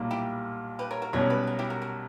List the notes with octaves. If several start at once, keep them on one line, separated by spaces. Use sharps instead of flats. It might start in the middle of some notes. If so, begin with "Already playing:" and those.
Already playing: B1 A#2 G3 A#3
E4 G4
G4 B4
A#4 C#5
F#4 A#4
B1 B2 G3 C#4 A#4 C#5
G4 B4
G4
F#4 A#4
E4 G4
F#4 A#4
F#4 A#4